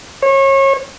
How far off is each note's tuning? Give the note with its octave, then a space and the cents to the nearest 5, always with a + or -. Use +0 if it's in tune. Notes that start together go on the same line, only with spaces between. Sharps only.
C#5 -30